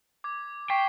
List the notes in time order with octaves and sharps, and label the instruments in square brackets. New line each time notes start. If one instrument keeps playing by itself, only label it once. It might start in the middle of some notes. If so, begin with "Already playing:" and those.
[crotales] D6 G#6
[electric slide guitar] G5 [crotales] C#6 B6 C7